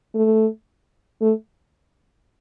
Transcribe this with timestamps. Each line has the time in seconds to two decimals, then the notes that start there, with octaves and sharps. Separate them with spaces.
0.15 A3
1.21 A3